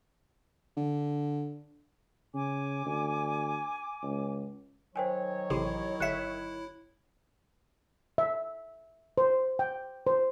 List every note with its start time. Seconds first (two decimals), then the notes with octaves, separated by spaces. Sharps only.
0.77 D3
2.34 C#3 G#5 D6
2.86 D2
4.03 C#2
4.96 D#3 F#3 C5 C#5 G5 G#5
5.50 A1 C3 E4
6.00 G1 E5 F#6 C#7 E7
8.18 E5
9.18 C5
9.59 G5
10.07 C5